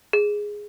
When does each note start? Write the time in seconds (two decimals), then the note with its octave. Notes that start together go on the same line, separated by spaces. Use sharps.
0.13 G#4